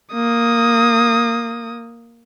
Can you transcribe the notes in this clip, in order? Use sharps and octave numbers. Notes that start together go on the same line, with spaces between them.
A#3 D#6